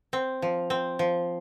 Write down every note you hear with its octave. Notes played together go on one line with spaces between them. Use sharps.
C4
F3
C4
F3